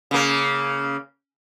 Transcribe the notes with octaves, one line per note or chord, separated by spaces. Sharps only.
C#3 A#3